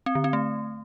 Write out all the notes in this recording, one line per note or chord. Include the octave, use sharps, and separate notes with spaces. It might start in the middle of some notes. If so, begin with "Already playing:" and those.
C4
D3
C4
A3